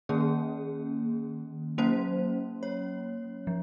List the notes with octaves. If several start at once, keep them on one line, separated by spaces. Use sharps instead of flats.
D#3 A#3 C#4 G#4
F#3 A#3 C#4 C5
C#5
F3